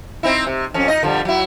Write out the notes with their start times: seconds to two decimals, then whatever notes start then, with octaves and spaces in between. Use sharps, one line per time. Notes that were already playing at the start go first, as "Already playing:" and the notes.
0.23 C4 D#4 E4
0.47 C3
0.74 F2 C#4
0.88 D#4 D#5
1.03 D3 F3 G3
1.25 F#3 E4